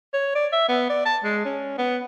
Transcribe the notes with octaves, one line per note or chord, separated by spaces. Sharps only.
C#5
D5
E5
B3
D5
A5
G#3
C#4
B3